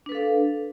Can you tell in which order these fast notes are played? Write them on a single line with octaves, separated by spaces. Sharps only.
D4 B4 A4 F5